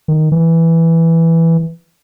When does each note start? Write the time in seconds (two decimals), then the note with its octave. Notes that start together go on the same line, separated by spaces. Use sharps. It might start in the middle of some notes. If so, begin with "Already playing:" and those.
0.08 D#3
0.32 E3